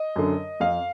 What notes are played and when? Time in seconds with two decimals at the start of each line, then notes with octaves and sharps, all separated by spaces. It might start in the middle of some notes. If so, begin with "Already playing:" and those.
Already playing: D#5
0.16 F#2 D3
0.60 F2 F5